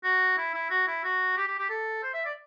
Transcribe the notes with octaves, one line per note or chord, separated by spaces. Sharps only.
F#4
E4
E4
F#4
E4
F#4
G4
G4
G4
A4
C5
E5
D5